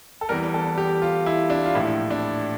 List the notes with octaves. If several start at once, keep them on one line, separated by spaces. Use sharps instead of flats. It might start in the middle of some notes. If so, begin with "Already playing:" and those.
A4
E2 E3 G3 A#4
A4
G4
F4
E4
D4
F4
A#1 A2 F3 E4
D4